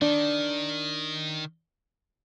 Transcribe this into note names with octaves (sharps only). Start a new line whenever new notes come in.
D#3 D4